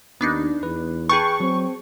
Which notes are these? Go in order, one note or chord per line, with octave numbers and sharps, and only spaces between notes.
D#2 B3 D4 D#4
E2 B4
G#4 B4 G5 A5 C#6
F#3 C4